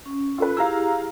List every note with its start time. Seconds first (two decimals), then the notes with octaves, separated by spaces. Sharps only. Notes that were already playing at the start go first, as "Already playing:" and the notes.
0.06 C#4
0.38 F4 A4 B4
0.57 E4 G4 G#4 F5 A#5 E6